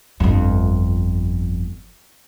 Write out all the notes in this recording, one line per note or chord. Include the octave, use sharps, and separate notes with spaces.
G1 F2